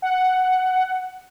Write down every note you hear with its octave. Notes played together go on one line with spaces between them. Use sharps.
F#5